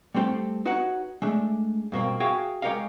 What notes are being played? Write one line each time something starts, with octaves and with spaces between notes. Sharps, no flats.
G3 A3 C4 G4 A4
D#4 F#4 B4 C#5 F#5
G#3 A3 D4
G2 B2 A#3 C4
F#4 G#4 E5 F5 G5
G#3 G4 A#4 C#5 D#5 F5